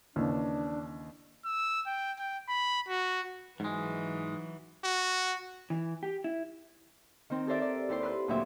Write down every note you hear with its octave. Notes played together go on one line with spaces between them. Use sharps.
D#2 C#3 E3 D4
E6
G5
G5
B5
F#4
G#2 E3 F#3 G#3
F#4
E3
G4
E4
D#3 C4
G4 A4 A#4 C5 D5 E5
D5
D#2 E4 G4 C5 C6
B4 C6 E6 F#6
D2 A#2 F#3 G4 E5